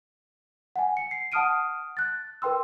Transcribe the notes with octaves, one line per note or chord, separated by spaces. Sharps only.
F#5 G#5
C#7
C7
F#5 A5 D#6 F6 D7 D#7
F#6 A6
A#4 B4 G5 C6 E6